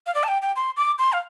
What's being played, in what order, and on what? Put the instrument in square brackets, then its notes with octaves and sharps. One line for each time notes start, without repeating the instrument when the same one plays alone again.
[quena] F5
D5
A5
G5
G5
C6
D6
C6
F5